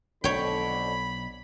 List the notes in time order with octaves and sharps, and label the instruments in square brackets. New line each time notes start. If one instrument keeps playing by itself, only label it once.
[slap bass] B1 [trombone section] F2 D3 [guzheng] C#5 G5 [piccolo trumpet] B5